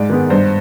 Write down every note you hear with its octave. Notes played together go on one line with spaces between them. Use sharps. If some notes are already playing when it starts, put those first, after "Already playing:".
Already playing: G#2 D5
D#3 G#3 B3
G2 C5